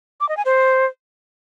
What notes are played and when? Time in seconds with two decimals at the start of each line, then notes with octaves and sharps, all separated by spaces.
0.21 D6
0.29 D#5
0.37 G#5
0.45 C5